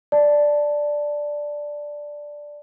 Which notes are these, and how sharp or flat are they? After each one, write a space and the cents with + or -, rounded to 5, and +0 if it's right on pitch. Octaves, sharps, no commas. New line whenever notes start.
D5 +0 A5 +0